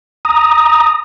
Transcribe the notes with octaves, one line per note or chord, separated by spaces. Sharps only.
A#5 D#6